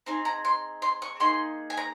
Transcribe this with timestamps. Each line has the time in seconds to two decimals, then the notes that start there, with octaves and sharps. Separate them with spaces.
0.06 C4 D#4 G#4 G#5
0.25 A#5
0.45 C6
0.82 C6
1.02 C#6
1.20 A#3 D#4 G#4 C6
1.70 G#5
1.77 A#5